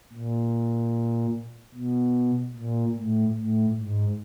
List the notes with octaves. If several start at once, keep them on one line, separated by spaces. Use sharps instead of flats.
A#2
B2
A#2
A2
A2
G#2